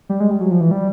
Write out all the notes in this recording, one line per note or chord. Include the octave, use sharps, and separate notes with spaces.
G3
G#3
G3
F#3
F3
E3
G3